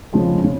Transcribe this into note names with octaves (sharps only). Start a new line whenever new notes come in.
F2 C#3 F3 G#3
C#3